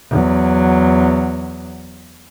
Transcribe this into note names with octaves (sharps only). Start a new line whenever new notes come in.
E2 F#3